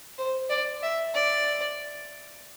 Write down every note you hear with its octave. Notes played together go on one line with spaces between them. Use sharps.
C5
D5
E5
D5